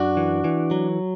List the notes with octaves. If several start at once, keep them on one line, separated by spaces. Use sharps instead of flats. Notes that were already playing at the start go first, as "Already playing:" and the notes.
Already playing: F#2 D4 F#4
E3
E3
F#3